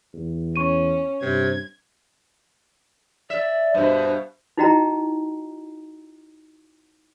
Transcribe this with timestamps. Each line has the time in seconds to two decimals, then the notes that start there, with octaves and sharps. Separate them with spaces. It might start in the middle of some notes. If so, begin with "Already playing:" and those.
0.14 E2
0.56 C#4 C#6 D#7
1.22 G2 C3 G#6
3.30 D5 E5
3.74 G2 B2 C5
4.57 D#4 E4 F#4 D#5 G5 A#5